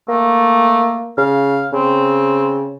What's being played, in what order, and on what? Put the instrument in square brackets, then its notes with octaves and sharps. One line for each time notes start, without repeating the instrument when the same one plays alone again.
[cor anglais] A3 [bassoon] A#3
[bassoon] C#3 [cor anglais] F5
[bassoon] C#3 [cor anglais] C4